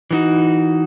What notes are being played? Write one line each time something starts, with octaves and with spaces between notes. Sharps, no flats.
E3 G3 B3 D#4 F#4